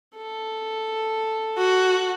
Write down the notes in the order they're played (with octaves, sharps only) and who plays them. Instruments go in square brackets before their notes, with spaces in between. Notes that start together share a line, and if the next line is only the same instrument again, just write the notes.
[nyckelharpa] A4
[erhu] F#4